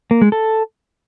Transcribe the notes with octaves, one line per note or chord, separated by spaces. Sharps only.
A#3
G#3
A4